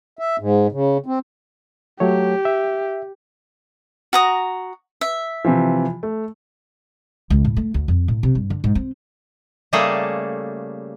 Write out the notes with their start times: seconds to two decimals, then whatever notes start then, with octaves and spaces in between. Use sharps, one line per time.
0.19 E5
0.39 G#2
0.72 C#3
1.06 C4
2.00 F#3 A3 G4 C#5
2.45 E5
4.13 F#4 A#5 D#6
5.01 E5
5.45 C3 E3 F3
6.03 A3
7.30 C#2
7.45 A2
7.57 A3
7.74 D2
7.88 F2
8.08 A2
8.23 C3
8.35 G2
8.50 D3
8.64 G#2
8.75 C4
9.73 C#3 G3 A3 A#3 G#4 A4